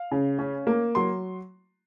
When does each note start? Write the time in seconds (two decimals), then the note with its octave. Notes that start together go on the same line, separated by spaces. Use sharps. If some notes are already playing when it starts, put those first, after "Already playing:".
Already playing: F5
0.11 C#3
0.39 C#4
0.67 A#3
0.95 F#3 C6